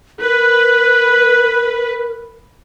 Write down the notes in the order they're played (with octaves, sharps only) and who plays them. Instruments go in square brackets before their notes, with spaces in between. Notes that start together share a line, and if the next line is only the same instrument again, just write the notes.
[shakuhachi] A#4 [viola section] B4 [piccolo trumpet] F#6